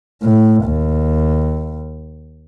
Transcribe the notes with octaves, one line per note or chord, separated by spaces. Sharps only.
A2
D#2